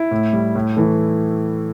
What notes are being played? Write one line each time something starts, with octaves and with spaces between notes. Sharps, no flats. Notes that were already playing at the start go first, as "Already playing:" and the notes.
Already playing: E4
A2
G3
A2
E3 A3